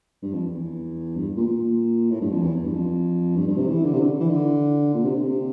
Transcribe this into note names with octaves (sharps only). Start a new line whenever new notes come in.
G2
F2
E2
G2
A#2
A#2
A2
G2
F2
E2
G2
F2
G2
G2
C3
E3
D3
C3
D3
E3
D3
A#2
C3
D3
C3